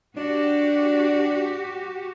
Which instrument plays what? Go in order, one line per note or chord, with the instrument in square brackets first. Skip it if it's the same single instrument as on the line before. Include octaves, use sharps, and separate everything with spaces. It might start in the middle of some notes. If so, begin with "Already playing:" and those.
[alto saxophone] D4 [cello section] F#4 G4